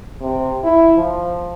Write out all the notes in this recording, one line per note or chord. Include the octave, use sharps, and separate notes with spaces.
C3
E4
F3